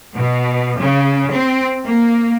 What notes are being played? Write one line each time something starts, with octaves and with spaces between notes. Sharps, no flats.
B2
C#3
C4
A#3